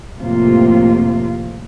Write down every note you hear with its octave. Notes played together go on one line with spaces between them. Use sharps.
F2 A2 C3 A#3 F4